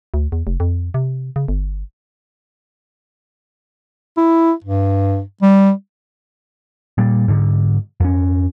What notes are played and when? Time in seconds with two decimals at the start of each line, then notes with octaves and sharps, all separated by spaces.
0.14 D2
0.32 E2
0.47 F1
0.60 F2
0.94 C3
1.36 C#3
1.48 G1
4.17 E4
4.64 G2
5.42 G3
6.98 A#2 G3
7.28 G#2 D3
8.00 F2 C#4